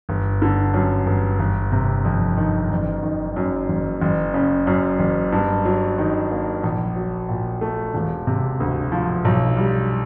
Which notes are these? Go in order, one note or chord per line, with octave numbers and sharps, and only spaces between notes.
G1
D3
F#2
G1
G1
C3
F2
D#3
F#1
D#3
F#2
F#1
F#1
C#3
F#2
F#1
G2
F#3
D#3
A#3
A#1
F#3
A#2
A3
E1
C3
D2
F3
B1
G3